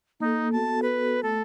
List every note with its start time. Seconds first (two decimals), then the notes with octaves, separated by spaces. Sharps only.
0.20 A#3 D#4 A4
0.52 B3 F#4 A4 A5
0.82 B4
1.23 A3 A4